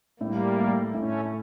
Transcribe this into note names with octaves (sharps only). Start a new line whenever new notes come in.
A2 G3 A#3
A3
A2 A3 C#4